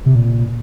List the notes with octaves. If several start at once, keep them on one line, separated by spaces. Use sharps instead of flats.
C3
A#2